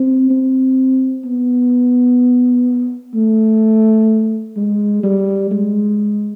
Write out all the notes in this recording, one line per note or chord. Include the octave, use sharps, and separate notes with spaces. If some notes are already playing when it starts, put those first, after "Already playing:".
Already playing: C4
C4
B3
A3
G#3
G3
G#3